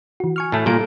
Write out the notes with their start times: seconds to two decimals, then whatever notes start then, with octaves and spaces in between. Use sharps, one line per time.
0.20 E3 F#4
0.36 G#5 C#6 F6
0.52 A2 A3
0.66 A#2 G3 A#3 A4 D7